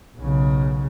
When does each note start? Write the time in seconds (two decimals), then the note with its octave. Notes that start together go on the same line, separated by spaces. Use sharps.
0.18 B1 C#3